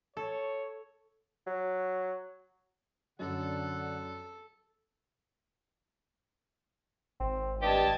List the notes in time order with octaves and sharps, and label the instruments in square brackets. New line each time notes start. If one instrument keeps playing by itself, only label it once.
[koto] A4 [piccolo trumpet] C#5
[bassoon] F#3
[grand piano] F#2 [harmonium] D3 F#5 [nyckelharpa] A4
[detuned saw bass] G#1 [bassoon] C4
[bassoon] G2 [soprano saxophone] G4 [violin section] D#5 A5 G#6